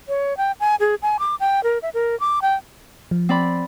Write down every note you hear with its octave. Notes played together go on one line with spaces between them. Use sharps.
C#5
G5
G#5
G#4
G#5
D6
G5
A#4
E5
A#4
D6
G5
F3
C4 D5 B5